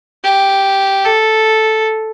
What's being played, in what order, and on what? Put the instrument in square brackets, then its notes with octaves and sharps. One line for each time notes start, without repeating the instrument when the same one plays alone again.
[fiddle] G4
A4